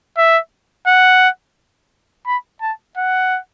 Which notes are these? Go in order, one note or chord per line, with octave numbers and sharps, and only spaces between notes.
E5
F#5
B5
A5
F#5